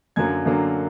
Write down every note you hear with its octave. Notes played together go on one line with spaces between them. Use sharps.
F#2 D3 F#3 A#3 G#6
F#2 D3 F#3 A#3